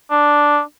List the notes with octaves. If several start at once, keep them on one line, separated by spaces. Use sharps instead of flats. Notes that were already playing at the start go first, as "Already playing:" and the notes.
D4